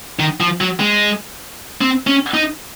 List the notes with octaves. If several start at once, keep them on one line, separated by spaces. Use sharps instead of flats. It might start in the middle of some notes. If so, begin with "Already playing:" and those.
D#3
F3
F#3
G#3
C4
C#4
D#4